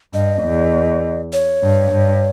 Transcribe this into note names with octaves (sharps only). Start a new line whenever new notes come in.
G2 D#5
E2
C#5
G2
G2